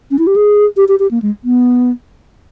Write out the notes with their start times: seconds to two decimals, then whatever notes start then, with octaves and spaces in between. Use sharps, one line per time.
0.11 C#4
0.19 E4
0.27 G4
0.36 G#4
0.77 G4
0.88 G4
0.99 G4
1.11 A#3
1.22 G#3
1.44 B3